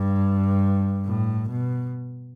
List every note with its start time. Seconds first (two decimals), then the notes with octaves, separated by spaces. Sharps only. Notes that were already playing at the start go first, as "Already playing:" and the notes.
Already playing: G2
1.06 A2
1.49 B2